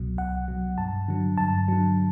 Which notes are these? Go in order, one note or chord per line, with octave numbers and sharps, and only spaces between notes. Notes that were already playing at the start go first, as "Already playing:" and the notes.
Already playing: C2 B2 F#3
C2 F#5
B2 F#3
G2 A5
D3 F#3
G2 A5
D3 F#3